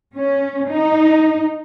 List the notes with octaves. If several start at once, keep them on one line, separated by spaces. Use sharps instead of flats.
C#4
D#4